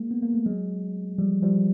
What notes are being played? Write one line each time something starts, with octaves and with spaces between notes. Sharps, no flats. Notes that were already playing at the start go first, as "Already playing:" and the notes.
Already playing: G#3 A#3
B3
A#3
A3
F#3 G#3
F3 G3
F3 G3